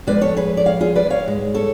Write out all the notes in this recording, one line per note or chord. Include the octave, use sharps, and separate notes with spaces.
F2 F3 G#3 B4 D5
A4 C#5
G#4 B4
D5
C#5 F5
F4 G#4
B4 D5
C#5 F5
G#2 G#3
A4 C#5